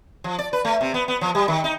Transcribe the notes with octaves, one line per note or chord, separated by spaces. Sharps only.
F3
D5
B4
A3
C3
B3
B3
F3
G3
D#3
D#4